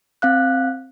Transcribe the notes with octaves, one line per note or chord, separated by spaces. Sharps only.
C4 F5 F#6